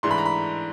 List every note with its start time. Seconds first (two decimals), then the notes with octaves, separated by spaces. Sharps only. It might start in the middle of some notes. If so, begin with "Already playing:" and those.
0.03 G#2 E3 A3 D4 C6
0.11 B5
0.18 A#5
0.26 B5